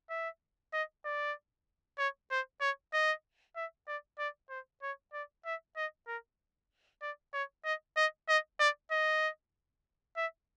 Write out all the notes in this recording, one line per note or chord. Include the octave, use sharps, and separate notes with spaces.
E5
D#5
D5
C#5
C5
C#5
D#5
E5
D5
D5
C5
C#5
D5
E5
D#5
A#4
D5
C#5
D#5
D#5
D#5
D5
D#5
E5